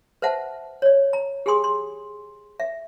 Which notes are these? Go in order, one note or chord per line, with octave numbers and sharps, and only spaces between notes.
B4 C5 E5 F#5 A5
C#5 D5
A#5
G4 G#4 G#5 C6 D#6
C6
E5